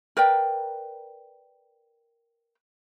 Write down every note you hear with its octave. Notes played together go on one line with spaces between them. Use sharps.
A#4 B4 D5 G5